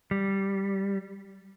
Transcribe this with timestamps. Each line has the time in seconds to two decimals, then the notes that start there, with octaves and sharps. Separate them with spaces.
0.11 G3